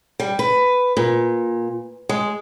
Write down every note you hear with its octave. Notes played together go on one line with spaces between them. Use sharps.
G3
B4
A#2
G#3